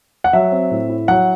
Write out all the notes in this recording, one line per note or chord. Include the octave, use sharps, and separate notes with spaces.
F#5
F#3 E5
C4
A2
E4
F#3 F#5